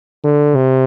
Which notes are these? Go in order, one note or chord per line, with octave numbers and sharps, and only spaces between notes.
D3
C3